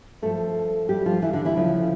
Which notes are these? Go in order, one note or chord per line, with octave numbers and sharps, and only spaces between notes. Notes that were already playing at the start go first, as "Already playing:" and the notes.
G2 F3 A3 A4
G3 G4
F3 F4
E3 E4
D3 D4
E3 E4
D2 C#3 F3